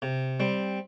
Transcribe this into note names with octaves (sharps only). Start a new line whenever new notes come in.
C3
G3 C4